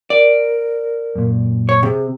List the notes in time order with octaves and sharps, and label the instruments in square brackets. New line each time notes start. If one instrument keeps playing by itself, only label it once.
[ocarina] A#4 [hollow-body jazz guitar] D5
[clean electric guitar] F#2 A#2
[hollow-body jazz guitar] C#5
[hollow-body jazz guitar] C3 [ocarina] G#4